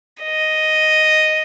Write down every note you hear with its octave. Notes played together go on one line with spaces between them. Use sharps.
D#5